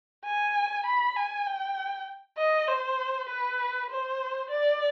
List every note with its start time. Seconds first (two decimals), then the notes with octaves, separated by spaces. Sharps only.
0.25 G#5
0.86 B5
1.17 G#5
1.47 G5
2.38 D#5
2.68 C5
3.29 B4
3.90 C5
4.51 D5